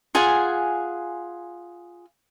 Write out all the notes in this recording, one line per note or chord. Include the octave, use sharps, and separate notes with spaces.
F4 G#4 F#5 G#5